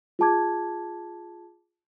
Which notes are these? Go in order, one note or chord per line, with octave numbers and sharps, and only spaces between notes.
F4 G#4 A5 D6 G#6